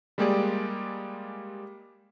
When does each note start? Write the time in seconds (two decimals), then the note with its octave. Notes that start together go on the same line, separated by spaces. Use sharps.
0.18 G3 G#3 A#3 G4 G#4 D5